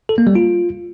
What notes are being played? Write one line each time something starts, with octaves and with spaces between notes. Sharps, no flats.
A4
A#3
G3
F4